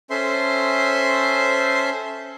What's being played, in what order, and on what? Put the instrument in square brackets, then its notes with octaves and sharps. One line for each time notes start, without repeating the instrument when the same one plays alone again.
[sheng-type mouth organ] C#4 A4 C5 E5 C6